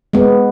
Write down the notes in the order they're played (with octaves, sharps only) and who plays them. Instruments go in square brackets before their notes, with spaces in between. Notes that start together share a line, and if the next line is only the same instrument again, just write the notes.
[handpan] G#3 B3